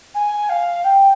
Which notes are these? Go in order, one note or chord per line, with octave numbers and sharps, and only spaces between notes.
G#5
F5
G5